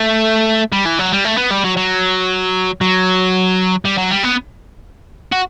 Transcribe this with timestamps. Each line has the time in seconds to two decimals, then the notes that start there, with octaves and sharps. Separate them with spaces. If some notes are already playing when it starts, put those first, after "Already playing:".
Already playing: A3
0.73 G3
0.86 E3
0.99 F#3
1.12 G3
1.25 A3
1.37 B3
1.50 G3
1.64 F#3
1.77 F#3
2.81 F#3
3.85 G3
3.98 F#3
4.11 G3
4.23 B3
5.32 F#4